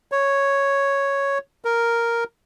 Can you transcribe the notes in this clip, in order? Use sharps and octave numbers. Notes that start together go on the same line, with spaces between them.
C#5
A#4